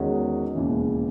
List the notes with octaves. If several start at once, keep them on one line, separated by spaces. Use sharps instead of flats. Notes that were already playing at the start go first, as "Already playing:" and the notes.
Already playing: E2 D#3 G#3 C#4 F#4
E1 D#2 C#3 E3